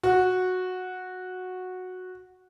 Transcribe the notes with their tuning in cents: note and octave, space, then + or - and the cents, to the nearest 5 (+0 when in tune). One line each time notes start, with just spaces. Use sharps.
F#4 -10